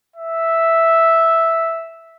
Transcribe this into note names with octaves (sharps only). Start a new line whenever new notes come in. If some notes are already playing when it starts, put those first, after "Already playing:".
E5